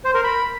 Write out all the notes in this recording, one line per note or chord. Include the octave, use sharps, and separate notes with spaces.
C5
A#4
B5